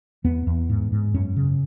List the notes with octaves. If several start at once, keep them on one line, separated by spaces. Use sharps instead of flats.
E2 B3
E2
G#2
G#2
F#2 C#4
C#3